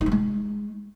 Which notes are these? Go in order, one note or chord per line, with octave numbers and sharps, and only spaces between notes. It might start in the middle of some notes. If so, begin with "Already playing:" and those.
D#4
F#3
G#3